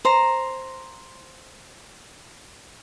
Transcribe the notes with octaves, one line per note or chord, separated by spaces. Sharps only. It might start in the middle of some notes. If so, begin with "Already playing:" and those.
C5 A#5